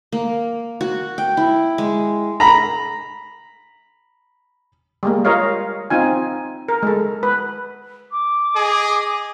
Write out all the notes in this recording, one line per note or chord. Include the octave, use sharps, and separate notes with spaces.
A#3
F#4
G5
E4
G#3
A#5 B5
G3 G#3 A#3
F4 A#4 C#5 D#5 F5
C4 D#4 F4 G#5
A#4
G#3 A4
B4
D6
G#4 D#5